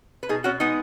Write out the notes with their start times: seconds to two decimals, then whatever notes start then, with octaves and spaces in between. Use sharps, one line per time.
0.23 B4
0.29 B2 D#4 G#4
0.44 B2 C#4 F#4
0.60 G#3 B3 D#4